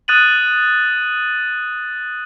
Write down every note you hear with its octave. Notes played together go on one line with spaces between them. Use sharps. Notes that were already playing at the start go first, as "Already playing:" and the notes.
D#6 F#6 A6 D#7 F#7